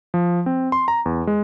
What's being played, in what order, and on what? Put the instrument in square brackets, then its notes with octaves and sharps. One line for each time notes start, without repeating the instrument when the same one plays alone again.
[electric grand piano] F3
C4
C6
A#5
E2
G#3